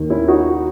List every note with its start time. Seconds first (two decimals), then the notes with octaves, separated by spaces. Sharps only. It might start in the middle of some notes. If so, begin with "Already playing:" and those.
Already playing: D#2 D#3
0.10 C#4 E4
0.28 D#4 F#4